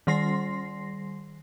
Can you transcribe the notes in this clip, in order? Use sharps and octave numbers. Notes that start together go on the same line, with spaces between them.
D#3 G3 C6 A#6 C7